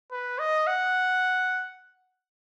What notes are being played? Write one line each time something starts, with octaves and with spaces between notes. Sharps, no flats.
B4
D#5
F#5